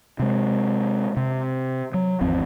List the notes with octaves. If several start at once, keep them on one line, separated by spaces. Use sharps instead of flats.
C3 G#3
C3
F#3
G#1 E2 F3 C4